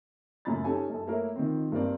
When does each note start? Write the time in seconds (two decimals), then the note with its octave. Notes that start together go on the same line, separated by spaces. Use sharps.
0.45 F#2 A2 C#3 A#5 B5 A6
0.64 C#4 D#4 G4 A4 G#5
0.90 F#2 A4 A5
1.07 A3 A#3 E4 A#4 C#5
1.36 D#3 F3 C4
1.72 G2 A#3 C4 A#4 D5